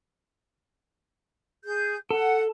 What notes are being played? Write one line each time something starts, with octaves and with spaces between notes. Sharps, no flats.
G#4 G6
A4 F#5